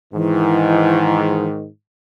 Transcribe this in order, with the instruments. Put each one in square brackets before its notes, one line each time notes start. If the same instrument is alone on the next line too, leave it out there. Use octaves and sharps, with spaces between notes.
[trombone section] G#2 D#3 [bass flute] E3